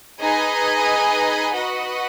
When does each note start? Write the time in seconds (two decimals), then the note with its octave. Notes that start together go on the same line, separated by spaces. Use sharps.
0.20 D#4 G#4 B4 D#5 G#5
1.54 F#4 B4 D#5 F#5